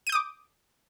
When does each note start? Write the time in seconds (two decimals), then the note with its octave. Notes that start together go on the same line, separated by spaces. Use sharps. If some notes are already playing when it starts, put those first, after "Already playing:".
0.07 D#7
0.09 G6
0.12 D#6
0.15 D6